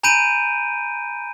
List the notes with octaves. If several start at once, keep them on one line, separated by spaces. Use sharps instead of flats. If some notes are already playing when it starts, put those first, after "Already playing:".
G#5 A#5 B5 G6 D7 D#7